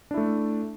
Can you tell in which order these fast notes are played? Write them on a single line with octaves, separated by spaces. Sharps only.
D4 E4 A3